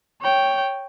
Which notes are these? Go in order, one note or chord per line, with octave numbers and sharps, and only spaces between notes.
C#5 G5